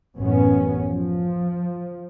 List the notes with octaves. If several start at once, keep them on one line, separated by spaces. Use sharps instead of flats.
A1 F#2 B3 C#4
F3